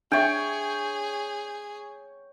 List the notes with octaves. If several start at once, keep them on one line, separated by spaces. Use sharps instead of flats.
D4 G#4 C#5 E5 G5